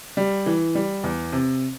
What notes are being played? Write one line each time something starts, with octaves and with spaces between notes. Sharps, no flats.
G3
E3
G3
E2
C3